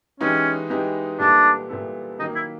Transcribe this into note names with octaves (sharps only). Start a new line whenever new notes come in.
E3 G#3 B3 C#4 D#4 G4
E3 G#3 B3 D#4 G4
A#2 G3 B3 D4 E4 A4
A#2 G3 B3 E4 A4
D#3 F#3 A#3 D#4
E4